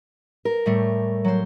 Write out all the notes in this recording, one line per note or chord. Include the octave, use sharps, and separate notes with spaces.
A#4
A2 G3 A3
F#3 C5